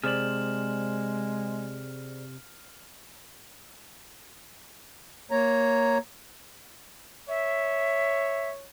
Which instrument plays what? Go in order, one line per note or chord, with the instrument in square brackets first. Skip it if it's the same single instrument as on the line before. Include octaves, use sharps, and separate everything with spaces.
[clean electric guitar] C3 [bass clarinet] G#3 [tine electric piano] G#4 C5 D5 [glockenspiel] F6 E7 F#7
[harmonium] A#3 C#5 A#5
[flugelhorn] C#5 [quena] E5